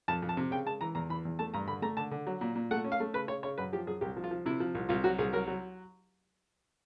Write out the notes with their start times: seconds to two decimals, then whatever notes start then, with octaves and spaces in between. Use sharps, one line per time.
0.08 F2 A5
0.22 F2
0.29 A5
0.37 C3
0.51 C#3 G5
0.65 G#3 A5
0.81 E3 A#5
0.95 E2 A#5
1.09 E3 B5
1.25 E2
1.39 A3 A5
1.54 G2 A#5
1.68 D3 B5
1.82 A3 A#5
1.97 D3 A5
2.11 D3
2.27 F#3
2.41 A#2
2.56 A#2
2.71 A3 F#5
2.84 C#4
2.92 F5
3.00 A3
3.14 C#3 B4
3.28 C#3 C#5
3.43 C#3 C#5
3.58 F#2 B4
3.73 F3 G4
3.87 F#2 G#4
4.01 C2 G4
4.17 F3
4.24 F4
4.31 F3
4.46 C3 E4
4.60 F3
4.75 C2
4.89 C2 F4
5.04 F#3 F#4
5.18 C2 G#4
5.33 F#3 A#4
5.48 F#3